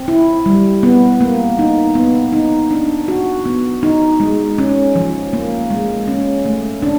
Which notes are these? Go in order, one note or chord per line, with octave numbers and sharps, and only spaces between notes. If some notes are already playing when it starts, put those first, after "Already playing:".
Already playing: C4
E4
G3
B3
A#3
D#4
B3
D#4
D4
F#4
B3
D#4
G#3
C#4
F3
A#3
G#3
C#4
A3
D4